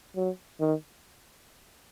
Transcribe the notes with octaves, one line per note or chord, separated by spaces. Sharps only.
F#3
D#3